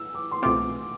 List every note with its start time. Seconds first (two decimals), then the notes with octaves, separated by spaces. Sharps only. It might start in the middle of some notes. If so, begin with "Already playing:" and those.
Already playing: E6
0.14 D6
0.31 C6
0.42 C2 B2 A3 C4 F4 D6